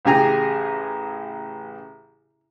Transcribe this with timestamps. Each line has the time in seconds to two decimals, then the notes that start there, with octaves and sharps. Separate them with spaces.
0.05 A1 C#3 G4 G#4 G#5 A#5